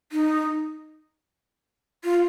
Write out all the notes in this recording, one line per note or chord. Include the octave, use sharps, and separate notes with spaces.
D#4
F4